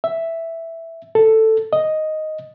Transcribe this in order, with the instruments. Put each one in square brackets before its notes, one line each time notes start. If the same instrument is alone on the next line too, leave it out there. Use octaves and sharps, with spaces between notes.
[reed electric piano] E5
A4
D#5